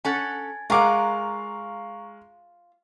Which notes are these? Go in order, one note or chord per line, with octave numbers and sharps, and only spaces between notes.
C#4 A4 F#5 G#5 G#6 A6
G#3 F4 A#4 F5 F#5 A#5 C#6 D6